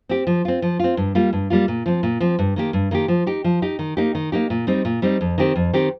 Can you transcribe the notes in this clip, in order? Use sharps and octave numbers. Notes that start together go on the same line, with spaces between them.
C4 G4
F3
C4 F4
F3
C4 F4
G2
G3 A#3 F4
G2
G3 A#3 F4
A#2
F3 C4
A#2
F3 C4
G2
D#3 A#3 G4
G2
D#3 A#3 G4
F3
D#4 G4
F3
D#4 G4
D#3
A#3 D#4 G4
D#3
A#3 D#4 G4
A#2
G3 C4 D#4
A#2
G3 C4 D#4
F2
D#3 C4 G4
F2
D#3 C4 G4